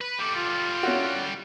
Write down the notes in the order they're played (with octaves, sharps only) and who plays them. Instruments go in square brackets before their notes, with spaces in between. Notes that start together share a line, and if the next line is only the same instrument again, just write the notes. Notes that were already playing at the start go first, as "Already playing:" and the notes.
[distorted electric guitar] B4
[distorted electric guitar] G3 A4 [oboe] D6
[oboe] F4
[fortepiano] C#4 E4 F#4